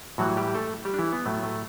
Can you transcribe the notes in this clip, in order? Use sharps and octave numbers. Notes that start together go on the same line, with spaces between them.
A2 E3 F#3 G3 F#4
G3 G4
A3 A4
G3 G4
D4
E3 E4
B3
A2 F#3 A3
A3